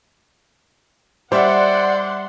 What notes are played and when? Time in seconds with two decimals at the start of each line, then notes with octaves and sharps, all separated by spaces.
1.32 G3 C5 D5 E5 F#5 C6